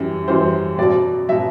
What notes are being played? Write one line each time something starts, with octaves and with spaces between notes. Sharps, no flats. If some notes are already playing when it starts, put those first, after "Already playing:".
Already playing: F#2 E3 G3
F#2 E3 G3 C5
B2 F#3 D5
B2 F#3 E5